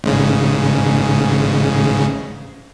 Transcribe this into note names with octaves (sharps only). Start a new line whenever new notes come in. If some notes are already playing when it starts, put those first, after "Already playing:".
A1 G#2 C#3